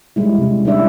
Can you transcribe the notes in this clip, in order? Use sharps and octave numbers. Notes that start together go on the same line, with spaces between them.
G3 G#3 E4
C3 C#4
G3 G#3 D4 E4 D5 E5